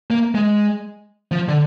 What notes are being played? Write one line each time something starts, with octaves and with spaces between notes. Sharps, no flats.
A#3
G#3
F3
D3